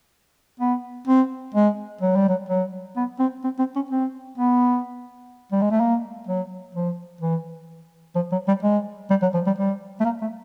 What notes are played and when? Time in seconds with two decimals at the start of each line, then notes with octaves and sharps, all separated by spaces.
0.60 B3
1.08 C4
1.54 G#3
2.01 F#3
2.16 G3
2.29 F#3
2.49 F#3
2.97 B3
3.19 C4
3.44 C4
3.59 C4
3.76 C#4
3.91 C4
4.38 B3
5.52 G3
5.62 G#3
5.71 A3
5.80 A#3
6.27 F#3
6.75 F3
7.21 E3
8.16 F3
8.32 F#3
8.48 G3
8.63 G#3
9.10 G3
9.22 F#3
9.34 F3
9.47 G3
9.58 G3
10.00 A3
10.05 A#3
10.22 A3